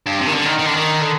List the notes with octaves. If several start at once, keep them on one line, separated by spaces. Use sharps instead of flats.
G2
C3
D#3
D3
D#3
D#3
D3
D#3
D3